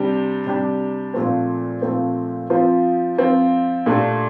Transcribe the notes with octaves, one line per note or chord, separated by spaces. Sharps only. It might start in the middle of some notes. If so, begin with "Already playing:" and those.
Already playing: C3 G3 D4 G4
C3 G3 D4 G4
A#2 F3 A3 C4
A#2 F3 A3 C4
F3 C4 F4
F3 C4 F4
A#2 A3 D4 G4